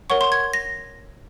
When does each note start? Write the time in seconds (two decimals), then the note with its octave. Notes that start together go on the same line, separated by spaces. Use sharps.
0.10 A#4 C#5 F#5 C#6
0.21 C6
0.32 G#6
0.53 A#6